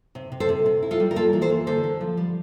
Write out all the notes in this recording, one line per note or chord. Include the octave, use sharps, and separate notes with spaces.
C3
C3
A4 C5
C3
C3
E4
F4 A4
G3
A#4
A#3 F4 A4
E3
A4 C5
A#3
D3 A4 C5
D3
F3
G3